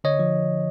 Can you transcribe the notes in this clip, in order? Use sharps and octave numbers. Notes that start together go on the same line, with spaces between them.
D3 C#5 D#5
F3